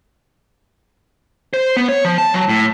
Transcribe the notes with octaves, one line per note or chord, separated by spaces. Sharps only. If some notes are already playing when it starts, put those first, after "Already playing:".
C5
B3
C#5
F3
A5
F#3
A2